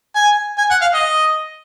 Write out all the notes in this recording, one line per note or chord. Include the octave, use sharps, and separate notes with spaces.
G#5
G#5
F#5
F5
D#5